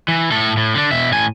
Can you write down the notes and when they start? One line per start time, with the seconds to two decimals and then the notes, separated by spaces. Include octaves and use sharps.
0.08 E3
0.32 A2 A4
0.57 A2
0.75 D3 D4
0.91 B2 E5
1.12 A2 G#5